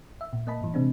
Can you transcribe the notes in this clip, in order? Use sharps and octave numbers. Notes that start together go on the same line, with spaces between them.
E5
A#2
A#3 D#5 A5 B5
G2 E3
C3 G#3 C4 D4